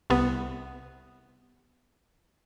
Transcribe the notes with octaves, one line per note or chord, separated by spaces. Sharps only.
C2 C3 B3